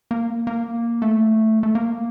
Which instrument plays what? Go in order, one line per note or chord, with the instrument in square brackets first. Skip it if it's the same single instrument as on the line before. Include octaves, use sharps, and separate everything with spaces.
[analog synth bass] A#3
A#3
A3
A3
A#3